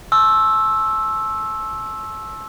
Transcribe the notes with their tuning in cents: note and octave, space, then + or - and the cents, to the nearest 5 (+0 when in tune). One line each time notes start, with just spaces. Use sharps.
A5 -40 C6 +45 E6 +0